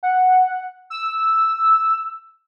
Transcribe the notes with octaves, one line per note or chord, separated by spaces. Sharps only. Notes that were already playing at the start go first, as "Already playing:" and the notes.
F#5
E6